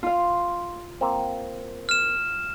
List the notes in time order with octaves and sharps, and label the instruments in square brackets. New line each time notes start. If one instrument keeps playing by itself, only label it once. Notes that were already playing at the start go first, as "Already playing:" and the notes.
[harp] F4 F5
[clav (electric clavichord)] A#3 C4
[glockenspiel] F6 E7